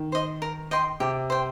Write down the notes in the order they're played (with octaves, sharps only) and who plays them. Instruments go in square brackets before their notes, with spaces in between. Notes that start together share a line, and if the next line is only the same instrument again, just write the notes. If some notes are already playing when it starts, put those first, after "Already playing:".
Already playing: [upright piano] D#3
[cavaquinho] C5 D#5
A#4
D#5 G5 C6
[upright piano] C3 [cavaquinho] G4
[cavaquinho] C5 G5